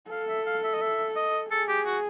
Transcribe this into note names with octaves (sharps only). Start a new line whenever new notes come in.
A4 F5
E5
F5
E5
D#5
E5
D#5
G#4 A4
G4
F#4